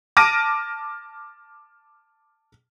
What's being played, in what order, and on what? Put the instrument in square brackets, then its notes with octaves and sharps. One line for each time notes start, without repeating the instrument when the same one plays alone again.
[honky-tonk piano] A5 D6 F6 A#6 D7 D#7